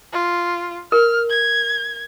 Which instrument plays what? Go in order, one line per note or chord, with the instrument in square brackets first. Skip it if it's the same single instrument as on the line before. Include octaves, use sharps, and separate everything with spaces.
[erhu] F4
[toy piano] A#4 [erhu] F6
[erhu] G#6